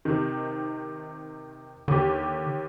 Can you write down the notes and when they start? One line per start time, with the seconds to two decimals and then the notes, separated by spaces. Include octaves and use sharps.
0.05 C3 D#3
1.88 D#2 D3 G4